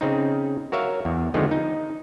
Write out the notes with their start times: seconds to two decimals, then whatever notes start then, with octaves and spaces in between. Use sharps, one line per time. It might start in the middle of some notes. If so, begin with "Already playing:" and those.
0.01 C#3 C4 D#4
0.72 F#4 A#4 C#5 E5 F5
1.05 E2
1.34 D3 D#3 F3 G#3 B3 C4
1.51 D#4